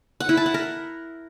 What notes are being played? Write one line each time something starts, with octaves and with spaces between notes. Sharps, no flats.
F#5
E4
A5
F#5
A#4